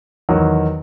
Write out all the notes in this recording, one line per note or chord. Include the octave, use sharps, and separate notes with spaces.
E2 D#3 F#3